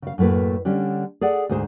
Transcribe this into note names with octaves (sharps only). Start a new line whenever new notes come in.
C#3 F5
F#2 A2 A3 A#3 B4
D3 G3 C#4
G#4 A4 D5 F#5
D2 G#2 G#4 C5